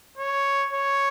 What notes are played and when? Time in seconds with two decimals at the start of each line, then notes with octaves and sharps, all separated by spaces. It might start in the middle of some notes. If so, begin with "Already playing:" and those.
0.18 C#5
0.73 C#5